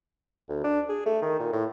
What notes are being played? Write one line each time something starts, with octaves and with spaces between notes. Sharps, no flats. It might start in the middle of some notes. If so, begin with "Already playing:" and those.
D2
D4
G#4
A3
D#3
A#2
A2